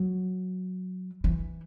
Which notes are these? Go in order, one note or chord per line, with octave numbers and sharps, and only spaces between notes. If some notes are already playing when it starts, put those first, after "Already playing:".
Already playing: F#3
E3